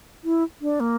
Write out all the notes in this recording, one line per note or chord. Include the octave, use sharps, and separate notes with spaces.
E4
D4
A#3